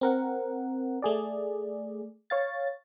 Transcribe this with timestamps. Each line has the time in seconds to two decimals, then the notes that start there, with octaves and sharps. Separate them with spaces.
0.01 C4 A#4 F#5
1.02 A3 G#4 D5
2.30 C#5 F5 A6